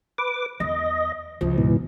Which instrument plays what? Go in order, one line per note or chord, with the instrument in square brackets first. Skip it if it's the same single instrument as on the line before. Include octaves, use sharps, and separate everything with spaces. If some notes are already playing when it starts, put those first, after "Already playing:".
[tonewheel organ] B4 D6
[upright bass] E2 [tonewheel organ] D#5
[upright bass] C#2 [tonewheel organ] F3
[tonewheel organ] G#2 B2 E3